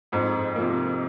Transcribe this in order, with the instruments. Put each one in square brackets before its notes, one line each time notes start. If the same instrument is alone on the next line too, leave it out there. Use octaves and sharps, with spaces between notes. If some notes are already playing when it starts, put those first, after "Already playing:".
[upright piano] F2 [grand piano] G#2
[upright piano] C3 F3 A#3